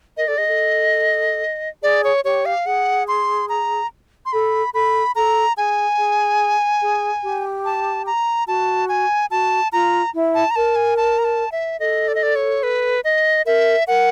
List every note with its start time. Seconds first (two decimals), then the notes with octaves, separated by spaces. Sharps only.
0.17 A#4 D#5
0.27 A4 D5
0.37 G#4 D#5
0.48 A4
1.83 G#4 D5
2.04 C#5
2.24 G4 C#5
2.46 F5
2.66 G#4 F#5
3.08 C6
3.49 A#5
4.26 C6
4.33 A4 B5
4.74 A4 B5
5.16 A4 A#5
5.57 G#4 G#5
5.98 G#4
6.82 G#4
7.23 G4
7.65 A5
8.06 A#5
8.47 F#4 A5
8.89 G#5
9.31 F#4 A5
9.72 F4 A#5
10.14 E4
10.34 A5
10.51 A#5
10.56 A#4 A5
10.76 G#5
10.97 A5
11.18 A#5
11.25 A5
11.52 E5
11.80 A4 D#5
12.08 D5
12.15 D#5
12.23 D5
12.36 C#5
12.63 B4
13.04 D#5
13.46 A#4 E5
13.87 A#4 F#5